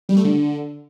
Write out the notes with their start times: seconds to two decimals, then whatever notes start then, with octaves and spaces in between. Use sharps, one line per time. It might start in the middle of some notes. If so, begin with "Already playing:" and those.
0.09 G3
0.17 A3
0.24 D3